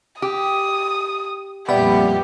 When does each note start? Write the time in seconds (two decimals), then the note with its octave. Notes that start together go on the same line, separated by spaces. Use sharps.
0.22 G4 D#6
1.69 F2 A#2 G3 B3 G4 D5 E5 B5